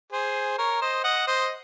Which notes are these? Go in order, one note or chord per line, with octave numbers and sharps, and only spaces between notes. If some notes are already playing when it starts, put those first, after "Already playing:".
G#4 C5
A#4 C#5
C5 D#5
D#5 F#5
C5 D#5